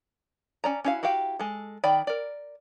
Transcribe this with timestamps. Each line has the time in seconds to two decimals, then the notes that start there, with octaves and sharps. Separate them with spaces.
0.64 C#4 D5 A#5
0.84 C#4 D4 E4 F#4 F5
1.03 E4 F#4 G4 F5 G5
1.39 G#3 A4
1.84 D#3 D5 G5 B5
2.07 A#4 D5